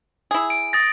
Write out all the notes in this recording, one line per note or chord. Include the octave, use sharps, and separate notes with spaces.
E4 G#4
D7
D#6 A6 A#6